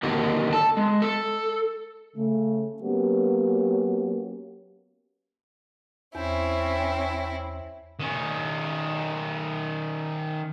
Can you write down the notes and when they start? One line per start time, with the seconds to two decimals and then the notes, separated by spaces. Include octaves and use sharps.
0.03 D3 D#3 F#3 A#3 A4
0.53 A4 A5
0.77 G#3
1.02 A4
2.16 C#3 A3
2.82 F#3 A#3 B3 C#4 F#4 G4
6.15 E2 C4 C#4 E4
8.00 D#3 C#4